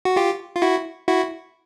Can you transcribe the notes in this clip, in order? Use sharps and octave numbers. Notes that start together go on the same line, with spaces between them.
F#4
F4 G4
F4
E4 F#4
E4 F#4